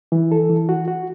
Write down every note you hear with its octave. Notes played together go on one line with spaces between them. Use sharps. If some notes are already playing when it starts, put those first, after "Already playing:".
E3
A4
E3
F#4
F#4